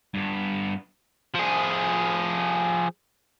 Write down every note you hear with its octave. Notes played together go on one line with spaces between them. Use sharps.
G2 B3
F3 G#4